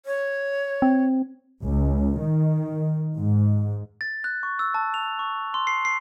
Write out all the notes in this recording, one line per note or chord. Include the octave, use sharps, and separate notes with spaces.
C#5
C4
C#2
D#3
G#2
A6
F#6
C#6
E6
A5
F7
C#6
C6
C7
C7